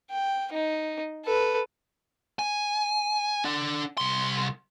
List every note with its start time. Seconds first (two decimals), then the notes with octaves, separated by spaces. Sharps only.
0.11 G5
0.52 D#4
1.25 A4 B4
2.39 G#5
3.44 D4 F#5
3.98 C2 C6